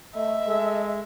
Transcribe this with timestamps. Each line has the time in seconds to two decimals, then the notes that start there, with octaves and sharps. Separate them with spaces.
0.15 A3 D#5 E5
0.46 G#3 A4